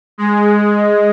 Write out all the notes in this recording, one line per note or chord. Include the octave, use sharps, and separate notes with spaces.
G#3